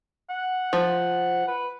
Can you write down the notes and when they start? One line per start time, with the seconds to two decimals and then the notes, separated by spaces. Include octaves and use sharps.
0.30 F#5
0.73 F3
1.48 B4